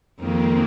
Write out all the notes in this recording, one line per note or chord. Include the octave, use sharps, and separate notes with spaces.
F2 D#3 G#3 A#3 C4